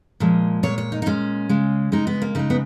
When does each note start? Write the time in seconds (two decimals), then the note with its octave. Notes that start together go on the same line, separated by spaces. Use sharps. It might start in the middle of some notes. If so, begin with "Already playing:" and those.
0.20 A#2 F3 G#3
0.63 A#2 G#3 C#5
0.78 C#5
0.92 D#4
1.02 D#4
1.06 A#2 G#3 C#4
1.49 C#3 G#3
1.92 C#3 G#3 D#4
2.07 B3
2.22 A#3
2.35 C#3 G#3 D#4
2.50 B3